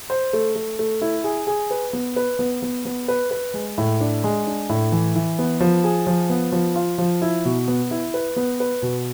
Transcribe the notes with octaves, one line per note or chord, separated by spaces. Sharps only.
C5
A3
A3
A3
E4
G#4
G#4
B4
B3
B4
B3
B3
B3
B4
B4
G#3
A2
D4
G#3
D4
A2
E3
E3
B3
F3
G#4
F3
B3
F3
F4
F3
E4
B2
B3
E4
B4
B3
B4
B2